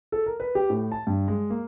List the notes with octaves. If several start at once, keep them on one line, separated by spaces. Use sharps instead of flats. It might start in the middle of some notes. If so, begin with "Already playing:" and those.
A4
A#4
B4
G4
A2
A5
G2
G#3
A#3